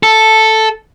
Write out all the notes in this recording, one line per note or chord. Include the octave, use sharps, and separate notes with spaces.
A4